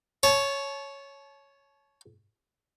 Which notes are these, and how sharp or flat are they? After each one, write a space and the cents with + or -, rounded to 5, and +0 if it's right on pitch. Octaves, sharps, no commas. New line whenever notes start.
C#5 +0 A5 -35